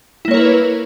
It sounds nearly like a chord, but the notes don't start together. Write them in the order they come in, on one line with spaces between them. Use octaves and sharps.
E4 A#3 C#5 A#4 B4